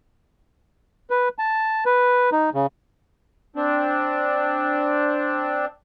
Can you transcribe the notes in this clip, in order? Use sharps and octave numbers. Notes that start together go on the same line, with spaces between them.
B4
A5
B4
D#4
C#3
C4 D4